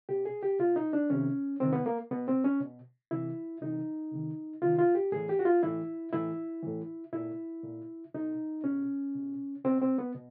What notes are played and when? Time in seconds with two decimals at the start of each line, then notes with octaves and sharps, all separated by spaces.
0.09 B2 G4
0.25 G#4
0.43 G4
0.59 B2 F4
0.76 D#4
0.93 D4
1.10 C3 D#3 C#4
1.60 C3 D#3 C4
1.73 B3
1.86 A#3
2.11 B2 B3
2.28 C4
2.44 C#4
2.61 B2
3.11 C3 E3 E4
3.61 C3 E3 D#4
4.11 C3 D#3
4.62 C3 D#3 F4
4.79 F4
4.95 G4
5.12 A2 E3 G#4
5.29 G4
5.39 F#4
5.45 F4
5.63 A2 E3 E4
6.13 A2 E3 E4
6.62 A2 E3
7.13 A#2 E4
7.63 A#2
8.14 B2 D#4
8.64 B2 C#4
9.15 B2
9.65 B2 C4
9.81 C4
9.98 B3
10.15 B2